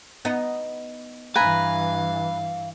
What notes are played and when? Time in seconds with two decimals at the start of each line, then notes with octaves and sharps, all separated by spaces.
0.25 B3 D#4
1.36 G2 E3 B4 F5 G#5 A#5